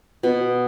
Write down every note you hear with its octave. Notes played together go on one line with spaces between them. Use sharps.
B2